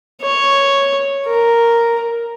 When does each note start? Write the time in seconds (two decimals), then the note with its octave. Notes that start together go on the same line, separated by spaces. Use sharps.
0.22 C#5
1.26 A#4